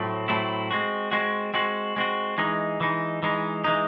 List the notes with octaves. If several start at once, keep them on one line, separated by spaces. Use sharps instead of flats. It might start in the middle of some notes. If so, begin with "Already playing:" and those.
Already playing: A2 F#3 A3 C4
A2 F#3 A3 C4 E4
G#3 C4 F#4
G#3 C4 F#4
G#3 C4 F#4
G#3 C4 F#4
E3 G#3 D#4
E3 G#3 D#4
E3 G#3 D#4
E3 G#3 D#4